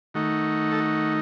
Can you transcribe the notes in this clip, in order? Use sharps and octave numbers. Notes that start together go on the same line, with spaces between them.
D#3 A3 D#4 F#4
A4
F#4